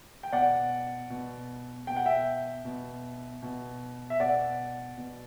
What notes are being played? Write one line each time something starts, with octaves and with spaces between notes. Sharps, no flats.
G5
B2 D5 F#5
B2
B2 G5
F#5
E5 G5
B2
B2
E5
B2 D5 F#5
B2